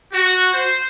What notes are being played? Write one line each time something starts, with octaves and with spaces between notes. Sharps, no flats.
F#4
C5